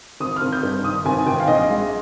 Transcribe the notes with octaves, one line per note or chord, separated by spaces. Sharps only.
G#1 D#6
F6
G#1
G6
G2
D#3 D#6
G#1 G#5
G#1 G5
F5
A#1 D#5
G#3